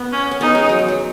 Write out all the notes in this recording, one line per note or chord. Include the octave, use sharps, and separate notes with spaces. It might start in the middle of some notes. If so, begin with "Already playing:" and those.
Already playing: B3
C#4
C#4
B3 D#4
G#3
F#3
G#3
F#3